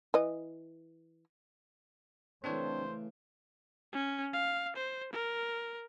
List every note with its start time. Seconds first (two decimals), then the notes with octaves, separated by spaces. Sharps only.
0.14 E3 D#5
2.44 C#3 E3 A3 C4 D4 C5 C#5
3.93 C#4
4.34 F5
4.76 C5
5.13 A#4